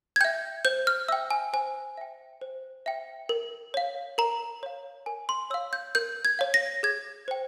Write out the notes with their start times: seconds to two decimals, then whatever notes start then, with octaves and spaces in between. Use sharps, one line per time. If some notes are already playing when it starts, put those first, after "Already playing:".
0.16 G#6
0.21 E5 G5 G6
0.65 C5 G6
0.87 F6
1.08 E5 G5 E6
1.31 G#5
1.53 C5 G#5
1.97 E5 G5
2.41 C5
2.86 E5 G5
3.29 A#4
3.74 C#5 F5
4.18 A#4 A#5
4.63 C#5 F5
5.06 A#4 G#5
5.29 C6
5.50 C#5 F5 E6
5.73 G6
5.95 A#4 G6
6.25 G#6
6.39 C#5 F5
6.54 A#6
6.83 G#4 G#6
7.28 C5 G5